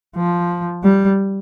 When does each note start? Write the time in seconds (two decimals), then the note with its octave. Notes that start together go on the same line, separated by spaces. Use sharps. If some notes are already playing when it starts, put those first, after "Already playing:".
0.16 F3
0.84 G3